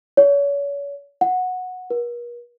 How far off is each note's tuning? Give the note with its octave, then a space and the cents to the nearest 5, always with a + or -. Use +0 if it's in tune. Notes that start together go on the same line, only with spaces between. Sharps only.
C#5 +35
F#5 -10
A#4 +45